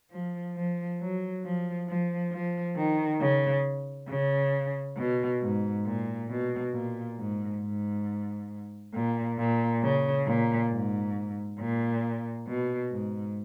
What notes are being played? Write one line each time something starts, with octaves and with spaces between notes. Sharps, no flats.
F3
F3
F#3
F3
F3
F3
D#3
C#3
C#3
B2
G#2
A#2
B2
A#2
G#2
G#2
A#2
A#2
C#3
A#2
G#2
A#2
B2
G#2